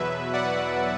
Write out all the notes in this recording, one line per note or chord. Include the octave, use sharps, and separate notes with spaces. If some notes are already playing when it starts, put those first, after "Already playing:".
Already playing: E2 B2 F#3 B4 E5
D5 F#5